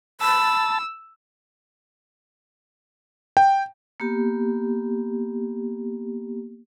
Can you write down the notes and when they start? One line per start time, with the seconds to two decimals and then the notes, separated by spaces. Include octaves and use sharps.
0.21 A5 B5 E6
3.37 G5
4.00 A#3 B3 G4